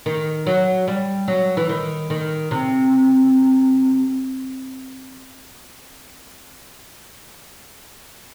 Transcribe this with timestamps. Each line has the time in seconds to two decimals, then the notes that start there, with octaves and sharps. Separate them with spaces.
0.06 D#3
0.47 F#3
0.88 G3
1.28 F#3
1.57 E3
1.69 D#3
2.10 D#3
2.51 C3